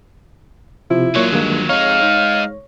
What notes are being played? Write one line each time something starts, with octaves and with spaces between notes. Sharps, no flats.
C3 F3 E4
A#2 F#3 F4 C#5
G2 D#3 G#3 A#3
F2 G#3 D#4 C#5 F5
G#2